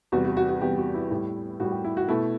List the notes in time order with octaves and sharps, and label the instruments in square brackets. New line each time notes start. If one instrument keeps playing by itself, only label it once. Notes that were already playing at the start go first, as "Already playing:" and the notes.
[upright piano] E2 C3 G3 F#4
F#4
F#4
F#4
E2 C3 G3 G4
F#4
E4
A2 G3
A2 G3 F#4
G4
E4
F#4
B2 A3 E4